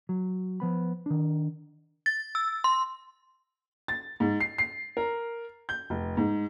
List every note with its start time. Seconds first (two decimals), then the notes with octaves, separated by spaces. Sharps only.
0.09 F#3
0.60 F3 B3 B5
1.06 D#3 D4
2.06 A6
2.35 E6
2.64 C6
3.88 A6
4.20 G#2
4.40 C7
4.58 C7
4.97 A#4
5.69 G6
5.90 F1
6.17 G#2